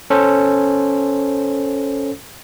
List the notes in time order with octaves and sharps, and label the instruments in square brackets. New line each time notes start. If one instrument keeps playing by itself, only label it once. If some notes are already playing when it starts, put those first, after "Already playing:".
[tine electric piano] C#4 A4 C5